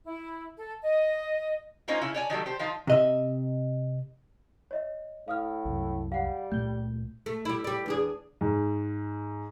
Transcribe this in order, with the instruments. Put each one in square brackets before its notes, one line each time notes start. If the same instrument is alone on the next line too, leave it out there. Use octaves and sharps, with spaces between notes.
[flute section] E4
A4
D#5
[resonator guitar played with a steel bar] A#3 C#4 D#4 F4 C5
C#3 C#4 E4
C#5 D5 G#5
D#3 F#3 G3 A3
G4 C5
D#3 F3 D#4 F4
[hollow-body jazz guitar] C3 D#5 E5
[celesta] C#5 D#5 E5
[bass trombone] A2 [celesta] F5 D#6 F6
[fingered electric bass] C2 F#2
[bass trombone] G3 [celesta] F5 F#5
[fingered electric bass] C#2 A#2 A3 [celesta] G6 G7
[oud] A3
G3 E4
G3 D5
E2 D4 G#4
[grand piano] G#2